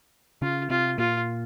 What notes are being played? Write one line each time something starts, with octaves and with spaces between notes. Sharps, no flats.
C#3 C#4 F4
C3 C4 F4
A#2 A#3 F4